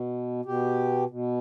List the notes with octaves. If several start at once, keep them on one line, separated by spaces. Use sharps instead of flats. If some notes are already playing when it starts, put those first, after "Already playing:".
Already playing: B2
B2 G4
B2